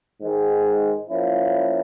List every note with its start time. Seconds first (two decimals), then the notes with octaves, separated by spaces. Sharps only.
0.20 G#2 D#3 G#3
1.10 F3 A#3 C#4 E4